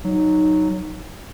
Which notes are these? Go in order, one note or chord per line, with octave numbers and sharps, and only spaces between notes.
F#3 D#4